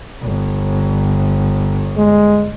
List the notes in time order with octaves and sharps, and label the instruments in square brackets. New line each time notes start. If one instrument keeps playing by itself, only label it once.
[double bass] G1
[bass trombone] G#3